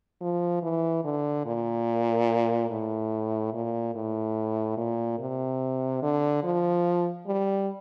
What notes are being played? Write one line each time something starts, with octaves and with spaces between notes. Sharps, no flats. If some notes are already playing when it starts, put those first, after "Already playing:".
F3
E3
D3
A#2
A2
A#2
A2
A#2
C3
D3
F3
G3